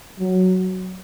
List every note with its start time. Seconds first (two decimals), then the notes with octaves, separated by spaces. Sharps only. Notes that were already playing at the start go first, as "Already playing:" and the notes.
0.19 F#3